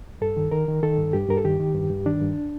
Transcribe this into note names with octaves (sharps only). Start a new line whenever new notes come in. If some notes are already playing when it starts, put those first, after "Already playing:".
G2 A4
D#3
D#3 A#4
D#3
D#3 A4
G2
G2 G4
G2 A#4
A4
D#3 G4
D#3
G2
G2
D#3 D4
G2